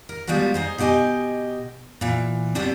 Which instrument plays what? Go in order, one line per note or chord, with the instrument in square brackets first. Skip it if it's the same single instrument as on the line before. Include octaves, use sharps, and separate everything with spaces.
[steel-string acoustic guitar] A#4
F3 G3 G#3 B3 F#4
D#4 G#4 C5
B2 E4 G4 D#5 G#5
A#2 E3
F#3 G3 B3 C4 D4